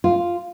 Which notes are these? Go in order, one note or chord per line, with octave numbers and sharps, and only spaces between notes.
F4